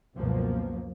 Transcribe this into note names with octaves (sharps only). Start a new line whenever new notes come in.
C#2 F#2 B2 F3 A#3